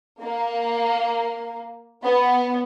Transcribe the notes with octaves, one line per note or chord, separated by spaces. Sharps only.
A#3
B3